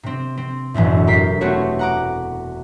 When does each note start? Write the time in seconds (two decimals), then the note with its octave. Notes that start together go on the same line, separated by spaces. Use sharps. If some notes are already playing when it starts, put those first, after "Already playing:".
0.03 C3 C4
0.37 C4
0.74 E1 A1 F#2 A2
1.07 G4 A#4 B6 C7
1.41 A3 B3 C4 F#4 G4 C#5
1.79 F#5 A#5 D6